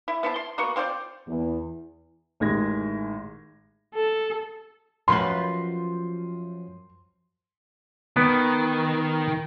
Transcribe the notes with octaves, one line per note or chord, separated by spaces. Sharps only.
E4
B3 E4 C5 A5
C6
A#3 B3 F#4 C#6
C4 F4 C5 D5
E2
A1 D#3 G#3 G#6 A#6
A4
F#2 F3 B4 C6
D#3 B3